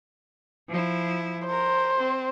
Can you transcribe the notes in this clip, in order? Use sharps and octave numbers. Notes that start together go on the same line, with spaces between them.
F3 E4
A#4 C5
C4